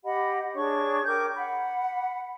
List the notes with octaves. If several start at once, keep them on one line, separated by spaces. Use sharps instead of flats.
G4 D#5 F#5 B5
D4 G#4 C#5 C#6
A#4 G5 D6 G6
F#5 B5